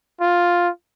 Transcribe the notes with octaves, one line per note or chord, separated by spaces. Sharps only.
F4